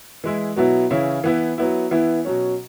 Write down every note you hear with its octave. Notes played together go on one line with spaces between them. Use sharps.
E3 G#3 E4
B2 F#3 B3 E4
C#3 E3 C#4 E4
E3 B3 E4
F#3 B3 E4
E3 B3 E4
B2 F#3 C#4